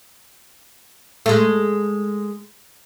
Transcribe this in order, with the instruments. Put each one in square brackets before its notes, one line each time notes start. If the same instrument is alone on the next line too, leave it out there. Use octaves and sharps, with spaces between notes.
[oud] G#3 A3